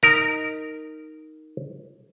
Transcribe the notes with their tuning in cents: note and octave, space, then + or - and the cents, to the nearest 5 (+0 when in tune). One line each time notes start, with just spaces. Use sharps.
D#4 +0 A#4 -10 A#5 -40